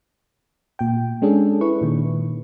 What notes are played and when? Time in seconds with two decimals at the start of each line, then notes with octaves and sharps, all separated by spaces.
0.79 A#2 G5
1.22 G#3 C#4 D4 G#4 A4
1.61 E4 B4 C#6
1.81 A#2 D#3